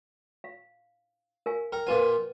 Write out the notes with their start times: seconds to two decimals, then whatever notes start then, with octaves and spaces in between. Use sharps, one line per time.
0.44 F5
1.46 A#4 F5 G#5
1.72 A#4 G5
1.87 A#2 F4 B4 F#5 G#5